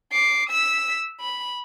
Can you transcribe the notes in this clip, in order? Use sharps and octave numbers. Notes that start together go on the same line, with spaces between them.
D6 C7
E6 B6
B5